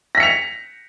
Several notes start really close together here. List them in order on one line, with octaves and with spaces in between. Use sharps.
A#6 B6 C#7 F7